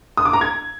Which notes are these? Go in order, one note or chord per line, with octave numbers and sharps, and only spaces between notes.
D#6
D6
A#5
G#6